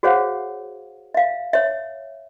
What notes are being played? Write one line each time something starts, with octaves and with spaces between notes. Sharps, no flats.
F#4 G#4 C5 C#5 F5 F#5
E5 F5
C#5 E5